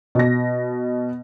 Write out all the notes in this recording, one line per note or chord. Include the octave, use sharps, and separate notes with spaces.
B2 A#6